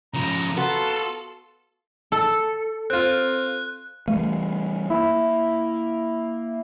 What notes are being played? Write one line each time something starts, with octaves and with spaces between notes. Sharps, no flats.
C#3 F3 A#5
B3 F4 F#4 A4
A4
C4 F4 F#6
E3 G3 A3 B3
A#3 E4